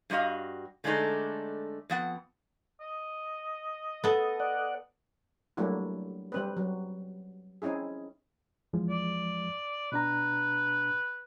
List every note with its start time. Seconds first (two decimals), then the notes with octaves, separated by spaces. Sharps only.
0.10 G2 G3 F#4 D#5 F5
0.84 D3 G#3 A3 D4 D#4
1.90 F2 B3 F#5
2.80 D#5
4.04 B3 A4
4.40 D5 F#5
5.57 F#3 G3 A3 A#3 D4 E4
6.32 G3 C4 B4
6.57 F#3
7.62 C4 C#4 D#4 E4 G#4
8.73 E2 F3 G#3
8.89 D5
9.92 B2 D4 B4 A#5